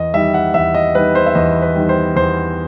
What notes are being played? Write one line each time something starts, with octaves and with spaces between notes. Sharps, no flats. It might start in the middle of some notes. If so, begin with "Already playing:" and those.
Already playing: E2 D#5
D#3 G3 E5
F#5
E2 E5
D#5
D#3 G3 B4
C5
E5
E2 D#5
B4
D#3 G3
C5
E2 C5